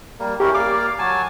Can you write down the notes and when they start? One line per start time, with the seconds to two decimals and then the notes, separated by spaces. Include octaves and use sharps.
0.20 G3 A#3
0.40 C#4 E4 G4 A#4
0.55 A#3 D5 F5 D6
0.99 F#3 G#5 A5